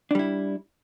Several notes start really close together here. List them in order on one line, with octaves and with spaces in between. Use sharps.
D4 G3 E4